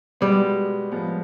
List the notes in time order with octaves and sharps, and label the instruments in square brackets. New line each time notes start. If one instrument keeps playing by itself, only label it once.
[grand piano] B2 G#3 B3 [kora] G3
[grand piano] A2 F3 G#3 B3